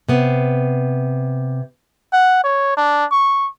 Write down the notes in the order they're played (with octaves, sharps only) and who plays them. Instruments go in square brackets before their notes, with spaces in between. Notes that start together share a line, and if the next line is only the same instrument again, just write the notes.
[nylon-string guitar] C3 B3
[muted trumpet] F#5
C#5
D4
C#6